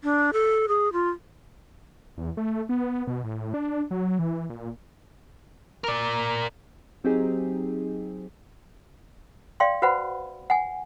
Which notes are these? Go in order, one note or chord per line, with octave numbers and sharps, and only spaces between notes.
D4
A4
G#4
F4
E2
A3
B3
B2
A2
D4
F#3
E3
A#2
A#4 D5
F#3 C4 D#4 G4 G#4
D5 F5 G5 C6
F#4 B4 C5 F#5 B5
F#5 G#5